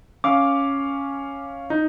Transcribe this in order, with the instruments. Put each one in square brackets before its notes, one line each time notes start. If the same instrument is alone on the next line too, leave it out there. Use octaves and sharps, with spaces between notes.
[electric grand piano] C#4 F5 [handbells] D6
[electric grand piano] D#4